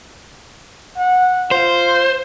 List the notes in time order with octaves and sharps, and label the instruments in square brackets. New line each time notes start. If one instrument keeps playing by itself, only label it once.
[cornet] F#5
[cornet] F4 [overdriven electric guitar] C5